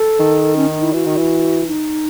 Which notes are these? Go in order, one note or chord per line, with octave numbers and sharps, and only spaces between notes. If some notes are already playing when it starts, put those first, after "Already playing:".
Already playing: A4
D#3
C#4
D#4
E4
E3 F#4
D#3
E3
D#4